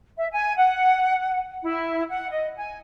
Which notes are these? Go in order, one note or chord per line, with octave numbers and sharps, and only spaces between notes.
E5
G#5
F#5
E4
F#5
D#5
G#5